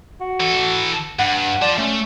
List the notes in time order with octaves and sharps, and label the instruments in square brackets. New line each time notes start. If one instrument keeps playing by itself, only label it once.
[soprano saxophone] F#4
[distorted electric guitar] E3 A4
[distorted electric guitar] G2 [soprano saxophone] F#5
[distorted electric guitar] F4 A5 [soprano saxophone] D5
[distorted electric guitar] A3 [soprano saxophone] C#4